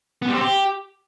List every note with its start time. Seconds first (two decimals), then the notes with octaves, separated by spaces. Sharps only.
0.22 B3
0.28 G3
0.35 C4
0.41 G4